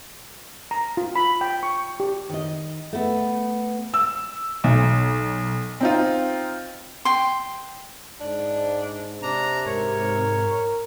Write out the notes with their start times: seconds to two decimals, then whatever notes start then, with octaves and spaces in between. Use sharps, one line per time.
0.71 A#5
0.97 F4
1.16 B5
1.41 G5
1.63 C#6
2.00 G4
2.29 D#3 D#5
2.93 A3 B3
3.94 E6
4.64 B1
5.81 C4 D#4 F4
7.05 G5 C6
8.20 G#2 D4
9.22 C3 D4 A#5
9.66 G#2 A#4 C#5